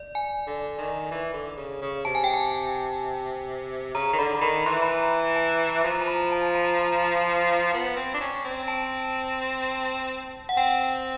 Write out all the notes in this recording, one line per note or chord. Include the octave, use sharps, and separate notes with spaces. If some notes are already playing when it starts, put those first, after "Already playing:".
Already playing: D5
G#5
D3
D#3
E3
D3
C#3
C#3
C3 A5
G#5
G5
G#5
C#3 A#5
D#3
D3 B5
A#5
D#3 B5
E3 C6
B5
A#5
A5
F3 A#5
A#5
B5
A5
A#5
A#5
B3
C4
D4
C#4
C4
A5
F#5
C4 G5